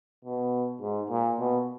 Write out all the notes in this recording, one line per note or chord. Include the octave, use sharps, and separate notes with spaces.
B2
G#2
A#2
B2